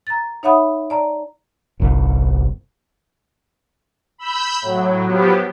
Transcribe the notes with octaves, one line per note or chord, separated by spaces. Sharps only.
A#5 A6
D#4 C#5 E5 F#5 B5 D#6
D5 A5 A#5
G1 C2
B5 E6 G6
A2 F#3
F3 F#3 B3 G4